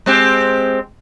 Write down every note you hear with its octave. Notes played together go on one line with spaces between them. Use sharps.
G#3 C4 G4